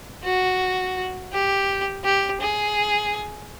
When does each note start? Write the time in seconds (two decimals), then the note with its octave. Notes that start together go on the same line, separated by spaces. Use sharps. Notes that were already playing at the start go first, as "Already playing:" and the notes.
0.24 F#4
1.33 G4
2.04 G4
2.41 G#4